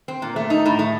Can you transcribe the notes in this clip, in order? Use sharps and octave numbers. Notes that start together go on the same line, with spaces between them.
C4
A#2
A3
D#4
A2
A3